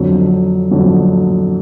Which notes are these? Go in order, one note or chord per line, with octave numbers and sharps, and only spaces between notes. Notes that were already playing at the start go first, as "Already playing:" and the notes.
Already playing: F2 D3 F#3
F2 D3 F#3